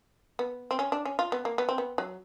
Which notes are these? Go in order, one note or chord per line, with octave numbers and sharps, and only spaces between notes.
B3
C4
C#4
D4
C#4
F4
B3
A#3
B3
C4
B3
F#3